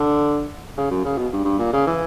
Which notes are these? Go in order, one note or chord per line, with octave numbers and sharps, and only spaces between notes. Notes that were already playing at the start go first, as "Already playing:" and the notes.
Already playing: D3
C#3
F#2
C#3
B2
G2
G2
A#2
C#3
E3